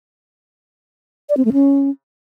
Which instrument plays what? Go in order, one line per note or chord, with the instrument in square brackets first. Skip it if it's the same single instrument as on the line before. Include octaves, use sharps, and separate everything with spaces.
[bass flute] D5
C4
A3
C#4